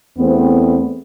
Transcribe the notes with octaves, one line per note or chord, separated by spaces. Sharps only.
E2 A3 B3 C4